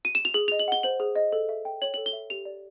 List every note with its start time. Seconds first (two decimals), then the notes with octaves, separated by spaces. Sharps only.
0.05 D#7
0.15 E7
0.25 F7
0.34 G#4 F#7
0.48 D#5 F7
0.59 F#7
0.68 F#5 G7
0.83 C5 F#7
1.00 G#4
1.16 D#5
1.33 A4
1.49 E5
1.65 G5
1.82 C#5 F#7
1.94 A4 F#7
2.06 G7
2.13 E5
2.30 G4 F7
2.45 D5